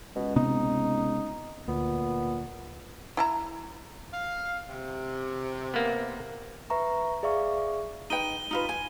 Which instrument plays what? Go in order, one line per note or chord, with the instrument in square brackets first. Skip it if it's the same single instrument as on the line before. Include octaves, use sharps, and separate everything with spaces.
[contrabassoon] C#2 [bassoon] B2
[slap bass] C3 B3 C4 [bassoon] D#4
[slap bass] D2 [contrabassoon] A#2 [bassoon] B3
[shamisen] E4 A5 A#5
[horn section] F5
C3
[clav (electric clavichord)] A#3 B3
[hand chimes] B4 E5 A#5 C#6
G#4 D5 E5 F5 C#6
[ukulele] D#4 B4 G5 [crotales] D#7 G7
[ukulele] D#4 F4 B4
G#5